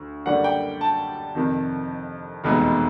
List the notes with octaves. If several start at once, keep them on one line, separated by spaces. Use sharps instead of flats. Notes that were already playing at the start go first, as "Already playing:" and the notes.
Already playing: D2
F#2 D3 G3 A#3 F#5
G5
A5
F2 C3 D#3
F1 E2 B2 G#3 B3